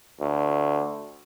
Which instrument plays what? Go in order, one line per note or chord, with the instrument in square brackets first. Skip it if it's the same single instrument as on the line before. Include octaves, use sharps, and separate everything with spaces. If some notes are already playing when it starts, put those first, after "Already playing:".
[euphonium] D2